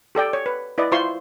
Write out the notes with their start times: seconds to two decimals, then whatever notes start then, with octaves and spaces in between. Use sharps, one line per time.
0.15 G4 A4 D5 G5
0.33 C#5
0.46 B4
0.78 E4 B4 D5 D#5
0.92 E4 F4 C5 C6 C#6